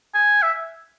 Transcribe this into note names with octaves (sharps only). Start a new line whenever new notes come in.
G#5
E5